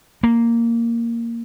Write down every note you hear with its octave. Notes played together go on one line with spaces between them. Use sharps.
A#3